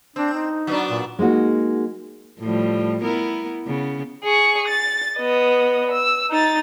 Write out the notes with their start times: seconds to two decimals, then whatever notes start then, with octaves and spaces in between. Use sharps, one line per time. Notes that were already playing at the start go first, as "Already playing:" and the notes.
0.16 C4 D4
0.34 D#4
0.67 F#3 B3 D4
0.90 A#2
1.19 G#3 A#3 D#4 F#4
2.40 A2 F3 G3
3.02 B3 E4 A#4
3.66 C#3 B3
4.24 G#4 C#6
4.68 A6
5.18 B3 D#5
5.92 E6
6.30 D#4 A6